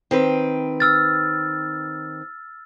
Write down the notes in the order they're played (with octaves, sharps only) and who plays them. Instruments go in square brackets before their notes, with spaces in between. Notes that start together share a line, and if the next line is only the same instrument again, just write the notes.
[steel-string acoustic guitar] D#3 C4 B4
[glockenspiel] E6 F6 A6